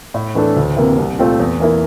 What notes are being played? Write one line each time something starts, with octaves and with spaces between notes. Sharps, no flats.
A2
E3 A3 D4 A4
D2
C3 E3 A#3
C2
A#2 A3 C4 F4
E2
E3 A#3 E4